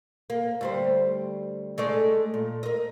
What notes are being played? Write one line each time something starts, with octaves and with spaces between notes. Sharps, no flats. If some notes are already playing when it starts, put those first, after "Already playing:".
A#3
D2 G3 C5
G#3 A3 D5
A#2
A#4 D#5